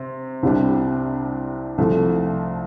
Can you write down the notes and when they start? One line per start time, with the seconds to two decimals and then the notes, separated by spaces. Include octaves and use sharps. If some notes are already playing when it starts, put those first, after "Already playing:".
Already playing: C3
0.43 C2 C3 G3 D4
1.78 C2 C3 F3 A3